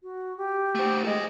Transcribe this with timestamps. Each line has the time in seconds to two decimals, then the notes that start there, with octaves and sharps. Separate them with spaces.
0.03 F#4
0.37 G4
0.75 A3 C5
1.05 G#3 A4 D#5